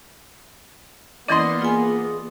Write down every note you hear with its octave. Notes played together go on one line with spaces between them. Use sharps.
E3 A#3 B3 C#4 E4 D5 D#5 C6
F4 G#4 G#5